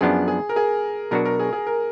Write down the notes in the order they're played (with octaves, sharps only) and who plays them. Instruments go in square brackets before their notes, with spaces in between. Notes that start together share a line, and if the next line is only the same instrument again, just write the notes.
[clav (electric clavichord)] F#2 F3 B3 D4 [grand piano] G#4
[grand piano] G#4
A#4
G#4
[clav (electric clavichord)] B2 F#3 D4 F#4 [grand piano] A#4
[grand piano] A#4
G#4
G#4
A#4